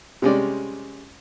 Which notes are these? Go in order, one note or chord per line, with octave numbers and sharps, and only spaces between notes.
C3 G3 G#3 C#4 D5